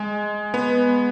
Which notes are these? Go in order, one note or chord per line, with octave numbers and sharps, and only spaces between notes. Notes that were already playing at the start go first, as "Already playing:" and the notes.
Already playing: G#3
B3